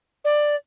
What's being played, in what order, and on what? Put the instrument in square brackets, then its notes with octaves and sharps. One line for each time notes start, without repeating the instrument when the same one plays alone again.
[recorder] D5